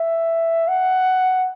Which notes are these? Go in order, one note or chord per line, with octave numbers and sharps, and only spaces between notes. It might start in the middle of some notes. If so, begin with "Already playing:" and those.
Already playing: E5
F#5